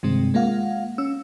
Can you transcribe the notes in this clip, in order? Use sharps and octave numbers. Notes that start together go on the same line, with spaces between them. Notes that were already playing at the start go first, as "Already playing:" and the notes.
G2 C3 D#3 G#3 C4
G#3 A#3 F4 F5 F#5
C#4 E6